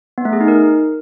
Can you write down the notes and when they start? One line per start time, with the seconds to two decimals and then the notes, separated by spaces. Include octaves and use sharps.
0.18 B3
0.25 A3
0.33 G#4
0.41 D#4
0.48 A#4